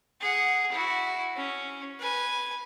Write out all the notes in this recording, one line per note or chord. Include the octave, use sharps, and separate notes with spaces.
G#4 F#5
E4 F#4
C#4
B4 G#5